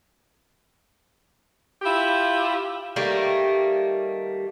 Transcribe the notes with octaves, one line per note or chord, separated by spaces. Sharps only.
E4 F4 G4
D#3 G3 A3 A#3